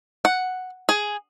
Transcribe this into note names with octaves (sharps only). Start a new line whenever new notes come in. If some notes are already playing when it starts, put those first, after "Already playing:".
F#5
G#4